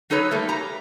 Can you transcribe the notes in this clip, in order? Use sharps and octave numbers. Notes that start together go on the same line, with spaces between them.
F#3 D#4 A4 B4 C#5
G3 A3 A#3
G4 A#5